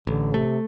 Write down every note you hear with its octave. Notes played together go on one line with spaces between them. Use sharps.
A1 D3
C3 A3